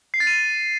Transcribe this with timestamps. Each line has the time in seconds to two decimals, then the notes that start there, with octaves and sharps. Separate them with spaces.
0.14 C7
0.20 A6
0.27 D#7